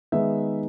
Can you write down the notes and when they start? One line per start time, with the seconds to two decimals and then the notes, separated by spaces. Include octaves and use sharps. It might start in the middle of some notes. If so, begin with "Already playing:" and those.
0.12 D#3 G#3 B3 D#4 E5